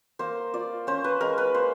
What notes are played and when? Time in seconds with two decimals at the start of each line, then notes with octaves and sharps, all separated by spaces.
0.19 A#3 C5
0.53 F4 D5
0.87 C#4 C5
1.04 B4
1.21 G#3 A#4
1.38 B4
1.55 A#3 C5